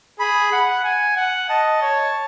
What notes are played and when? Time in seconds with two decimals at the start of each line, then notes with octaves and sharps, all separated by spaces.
0.20 G#4 B5
0.52 F#5
0.84 G#5
1.17 F#5
1.50 D#5 A5
1.82 C#5